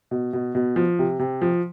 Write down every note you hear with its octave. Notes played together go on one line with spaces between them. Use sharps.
B2
B2
B2
F3
C3
C3
F3